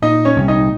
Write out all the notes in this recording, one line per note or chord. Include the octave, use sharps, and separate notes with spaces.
A#2 D#4 D#5
C#4 C#5
C2
D#4 D#5